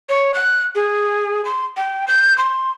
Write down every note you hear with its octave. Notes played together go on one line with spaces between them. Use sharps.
C#5
F#6
G#4
C6
G5
G6
C6